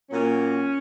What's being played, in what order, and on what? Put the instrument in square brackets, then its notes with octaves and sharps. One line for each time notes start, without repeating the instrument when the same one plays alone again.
[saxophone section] A#2 F#3 A#3 C#4